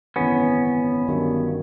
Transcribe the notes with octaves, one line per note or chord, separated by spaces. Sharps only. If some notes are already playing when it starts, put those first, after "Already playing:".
G#1 F#2 C#3 E3 B3 C#4
G1 G2 D#3 F#3